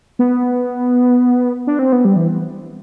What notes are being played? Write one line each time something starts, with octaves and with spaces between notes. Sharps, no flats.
B3
D4
C4
B3
G3
E3